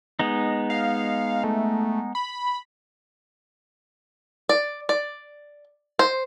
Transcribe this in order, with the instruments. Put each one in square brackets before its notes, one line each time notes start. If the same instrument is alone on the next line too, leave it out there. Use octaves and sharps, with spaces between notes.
[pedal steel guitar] G#3 B3 D#4
[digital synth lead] F5
A3
B5
[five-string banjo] D5
D5
C5